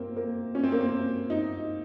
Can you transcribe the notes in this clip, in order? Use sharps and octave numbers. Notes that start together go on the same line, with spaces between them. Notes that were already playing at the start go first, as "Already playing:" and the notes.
Already playing: A#3 C4
A#3
C#4
C4
A#3
C4
D#4